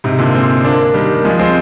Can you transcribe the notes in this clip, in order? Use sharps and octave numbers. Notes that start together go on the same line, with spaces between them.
G#2 C3
A#2 D3
G#3 C4
A#3 D4
D#3 G3
F3 G#3
G#3 C4